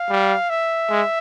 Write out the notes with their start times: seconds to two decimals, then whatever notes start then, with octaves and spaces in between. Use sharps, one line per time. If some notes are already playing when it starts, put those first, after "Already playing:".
Already playing: F5
0.10 G3
0.50 E5
0.90 G#3